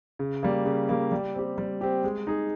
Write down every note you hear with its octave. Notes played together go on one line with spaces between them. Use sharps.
C#3
G3 A#3
C#3
G3 A#3
G3
C4 G4
G3
C4 G4
G#3
D#4 G#4